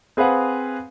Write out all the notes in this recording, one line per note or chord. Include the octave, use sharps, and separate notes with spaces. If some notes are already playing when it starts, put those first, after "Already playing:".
C4 G#4 B4 C5 F5 F#5